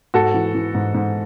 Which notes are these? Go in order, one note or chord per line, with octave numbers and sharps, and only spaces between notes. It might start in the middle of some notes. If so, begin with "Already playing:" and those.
G#2 F#4 A4
E3
E3
G#2
G#2